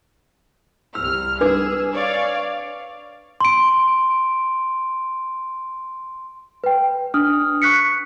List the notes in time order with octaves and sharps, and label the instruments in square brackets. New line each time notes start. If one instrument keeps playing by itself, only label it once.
[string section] C2 F6 [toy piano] E6
[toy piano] D4 B4 D6 [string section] G#4 E6
[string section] C#5 D5 F5
[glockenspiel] C6 D7
[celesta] B4 G5
D4 D#6 F6
C#6 F#6 B6 C#7